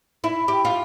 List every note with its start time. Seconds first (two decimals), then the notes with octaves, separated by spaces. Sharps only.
0.24 E4
0.48 G4
0.65 F4